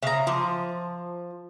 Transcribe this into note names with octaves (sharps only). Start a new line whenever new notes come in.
C#3 E5 F5 A#5 D#6
F3 F4 C6 D6